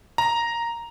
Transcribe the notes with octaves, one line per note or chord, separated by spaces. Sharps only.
A#5